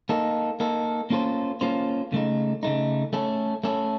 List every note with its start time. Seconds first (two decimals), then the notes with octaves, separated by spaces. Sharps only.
0.09 A#3 D#4 A4
0.60 A#3 D#4 A4
1.10 A#3 C#4 F4 A4 C5
1.61 A#3 C#4 F4 A4 C5
2.12 C#3 A3 D#4
2.63 C#3 A3 D#4
3.13 A3 C#4 A4
3.64 A3 C#4 A4